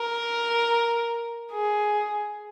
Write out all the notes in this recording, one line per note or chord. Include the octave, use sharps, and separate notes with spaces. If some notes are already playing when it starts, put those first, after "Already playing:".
Already playing: A#4
G#4